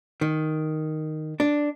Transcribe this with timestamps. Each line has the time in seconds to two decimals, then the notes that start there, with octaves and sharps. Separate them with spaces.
0.21 D#3
1.40 D4